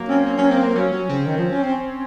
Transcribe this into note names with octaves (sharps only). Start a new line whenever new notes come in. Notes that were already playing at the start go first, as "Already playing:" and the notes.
Already playing: F#3 A#3
C4 C#4
A#3 C#4
F#3 C#4
A#3 C4
A#3 C4
F#3 C#4
F#3 C#4
C#3 C4
D#3
F3
C#4
C4